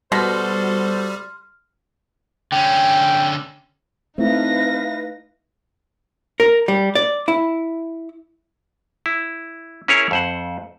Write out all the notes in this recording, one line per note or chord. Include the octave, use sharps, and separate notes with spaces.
B2 G3 F#4 A4 C5 C6 F6
D3 C#4 G5
A3 C4 D#4 E4 B4 E5 F5 A#6
A#4
G3
D5
E4
E4
C#4 E4 G#4 A#4 C#5
F2 C5 F#5